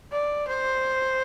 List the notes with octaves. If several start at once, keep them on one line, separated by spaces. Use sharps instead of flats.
D5
C5